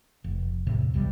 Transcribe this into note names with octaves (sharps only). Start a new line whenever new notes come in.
F1
E2 A2 C3
B1 E2 C3 G3